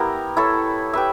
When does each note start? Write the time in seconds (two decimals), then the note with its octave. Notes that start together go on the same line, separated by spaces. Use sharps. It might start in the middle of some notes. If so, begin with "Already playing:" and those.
Already playing: B3 E4 G4 A#4
0.37 E4 A4 C#5
0.94 G4 B4 E5